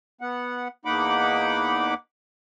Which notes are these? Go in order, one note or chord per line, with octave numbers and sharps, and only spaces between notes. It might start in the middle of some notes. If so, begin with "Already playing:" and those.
B3 F#5
E2 A#3 D#4 F#5 B5 D6